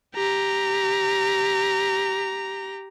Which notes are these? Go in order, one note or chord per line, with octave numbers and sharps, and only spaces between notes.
G4 A#5